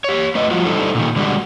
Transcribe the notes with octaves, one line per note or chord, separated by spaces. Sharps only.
G4 C#5
A3 B4 D#5
F3 G3 F4 F#4
G3 D4 D#4 A4 C5
A#2 D#3
D3 G3 G#3 F#4